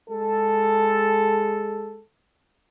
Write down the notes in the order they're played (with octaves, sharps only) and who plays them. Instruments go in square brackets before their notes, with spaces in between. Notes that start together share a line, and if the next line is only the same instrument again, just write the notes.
[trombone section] G#3 A4